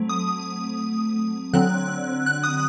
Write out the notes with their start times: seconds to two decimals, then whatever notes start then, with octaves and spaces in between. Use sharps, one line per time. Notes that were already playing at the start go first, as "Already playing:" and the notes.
Already playing: F#3 A3 C4
0.09 D#6
1.53 D3 F#3 C4 F#6
2.26 F#6
2.44 D#6